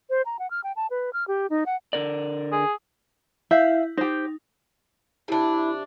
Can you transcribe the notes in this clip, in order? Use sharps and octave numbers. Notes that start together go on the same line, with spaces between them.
C5
A#5
F#5
F6
G5
A5
B4
F6
G4
D#4
F#5
D3 A#4 D5
G#4
E4 E5 F5 G6
D#4 G4 C5
C3 D4 E4